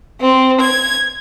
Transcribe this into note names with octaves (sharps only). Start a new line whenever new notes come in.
C4
G#6